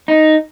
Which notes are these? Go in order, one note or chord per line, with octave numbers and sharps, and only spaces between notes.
D#4